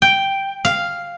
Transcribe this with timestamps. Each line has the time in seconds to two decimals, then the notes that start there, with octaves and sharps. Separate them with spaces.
0.02 G5
0.65 F5